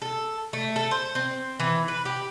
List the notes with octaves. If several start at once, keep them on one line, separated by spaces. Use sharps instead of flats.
A4
A3
A4
C5
C4
E3
B4
G4